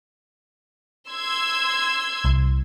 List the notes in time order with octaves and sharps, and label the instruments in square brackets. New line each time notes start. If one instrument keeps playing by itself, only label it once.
[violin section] C6 E6 G#6
[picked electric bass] C2